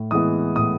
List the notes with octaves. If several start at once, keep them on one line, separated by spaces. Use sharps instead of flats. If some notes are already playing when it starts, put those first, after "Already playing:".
Already playing: A2
E3 G#3 B3 D#6
A2 D#6